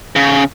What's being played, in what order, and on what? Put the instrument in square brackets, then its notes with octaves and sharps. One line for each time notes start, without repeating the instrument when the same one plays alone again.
[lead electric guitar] C#3